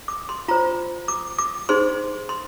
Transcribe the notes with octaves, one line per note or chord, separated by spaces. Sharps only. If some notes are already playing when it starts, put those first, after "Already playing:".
D6
C6
F4 C5 A#5
D6
D6
D#4 G#4 C5 C6
C6